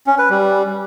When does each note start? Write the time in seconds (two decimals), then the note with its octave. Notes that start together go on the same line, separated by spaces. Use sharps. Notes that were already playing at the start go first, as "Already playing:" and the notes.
0.07 C#4
0.18 B4
0.30 G3